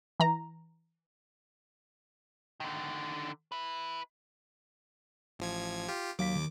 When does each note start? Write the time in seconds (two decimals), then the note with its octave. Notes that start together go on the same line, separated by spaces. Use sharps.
0.20 E3 A#5
2.60 D3 D#3
3.52 E4 B4
5.39 A1 F3 G#6
5.88 F4 G4
6.19 D#2 F#3 F5 D6 B6
6.35 D#3